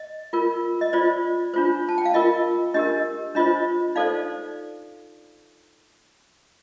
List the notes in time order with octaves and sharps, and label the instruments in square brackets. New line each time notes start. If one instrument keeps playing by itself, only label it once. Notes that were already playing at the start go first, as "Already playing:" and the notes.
Already playing: [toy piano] D#5
F4 A#4
D#5
F4 C5 D5
D4 F4 C5
A5
G5
F5
F4 A#4 D#5
D4 G4 A#4 D#5
D4 F4 C5 D#5
D#4 A4 C5 D5 F5